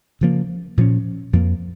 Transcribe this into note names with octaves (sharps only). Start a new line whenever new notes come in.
C#3 F3 A#3
A#2 F3 C#4
F2 F3 A#3